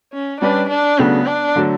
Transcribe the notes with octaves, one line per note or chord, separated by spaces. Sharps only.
C#4
G3 C#4 D4 G4 B4 D5
D4
C#3 F#3 A3 B3 D4 F#4
D4
D3 F#3 A3